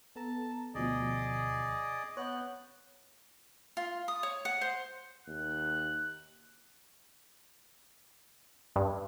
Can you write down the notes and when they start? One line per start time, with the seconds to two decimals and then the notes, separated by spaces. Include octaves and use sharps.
0.16 B3 A4 A5 A#5
0.75 D2 B2 F3 G#4 D5 D#5
2.17 B3 C#5 F#5 F#6 G6
3.77 F4
4.08 D#6
4.23 C#5
4.45 F#5
4.61 C5
5.27 D#2 F#6
8.76 G2